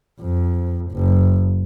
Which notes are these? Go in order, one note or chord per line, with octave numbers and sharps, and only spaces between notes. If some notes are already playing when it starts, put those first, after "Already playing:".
F2
F#1